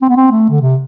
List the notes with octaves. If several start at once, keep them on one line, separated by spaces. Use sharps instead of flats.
C4
B3
C4
A3
D3
C3